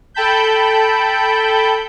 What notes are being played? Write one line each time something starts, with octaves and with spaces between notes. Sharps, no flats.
A4 G5 A5 B5 G6